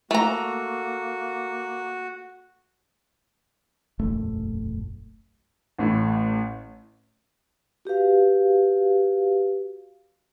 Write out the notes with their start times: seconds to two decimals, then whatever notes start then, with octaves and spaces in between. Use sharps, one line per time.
0.11 A3 A#3 F#4 A#5
3.99 E1 A#1 F#2 A3
5.78 A1 A2
7.85 F#4 G4 B4 F5